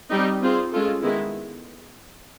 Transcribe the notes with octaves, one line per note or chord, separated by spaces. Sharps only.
G3 C4 D#4 G4
C4 F4 G#4 C5
G#3 C#4 F4 A4
D#3 G#3 B3 E4